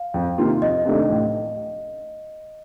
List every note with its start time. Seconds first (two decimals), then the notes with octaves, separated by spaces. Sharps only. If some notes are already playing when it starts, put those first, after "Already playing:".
Already playing: F5
0.14 F2
0.38 C3 D#3 A#3 F4
0.62 F2 D#5
0.85 C3 D#3 A3 D4
1.10 A1